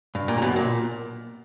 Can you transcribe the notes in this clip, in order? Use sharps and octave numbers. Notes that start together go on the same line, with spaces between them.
G2
A#2
C#3
B1 B2
A#2